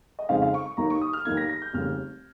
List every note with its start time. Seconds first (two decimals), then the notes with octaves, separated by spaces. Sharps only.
0.19 D#5
0.29 F2 C#3 G#3 C4 D#4 F5
0.42 F5
0.54 C#6
0.66 C#6
0.77 D#2 D#3 A#3 D#4 A#5
0.90 C#6
1.01 D#6
1.13 F6
1.25 D#2 D#3 A#3 D#4 G#6
1.37 A#6
1.49 A#6
1.62 G6
1.73 F1 D#2 C#3 G3 F6